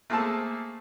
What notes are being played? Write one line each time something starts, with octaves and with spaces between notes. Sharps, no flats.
A3 A#3 G#4 C5 A5 E6